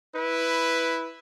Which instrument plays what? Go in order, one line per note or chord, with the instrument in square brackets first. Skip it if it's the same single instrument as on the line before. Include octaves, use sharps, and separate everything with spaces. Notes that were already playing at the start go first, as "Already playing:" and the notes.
[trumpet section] E4 B4